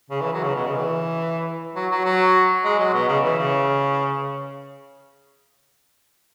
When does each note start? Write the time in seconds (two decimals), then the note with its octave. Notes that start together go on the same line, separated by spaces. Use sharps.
0.10 C#3
0.21 E3
0.33 F#3
0.43 C#3
0.55 B2
0.66 C#3
0.77 E3
1.76 F#3
1.91 F#3
2.05 F#3
2.65 G#3
2.79 F#3
2.94 B2
3.08 C#3
3.24 E3
3.38 C#3